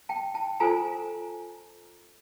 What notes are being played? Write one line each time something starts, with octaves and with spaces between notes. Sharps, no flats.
G5 A5
G5 A5
F4 A4 C5 G#5 A#5